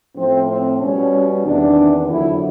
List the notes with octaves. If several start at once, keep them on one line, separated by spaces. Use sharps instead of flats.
A2 F3 C4
C4
B2 G3 C#4
E2 C3 D#3 D4
F2 D3 F#3 E4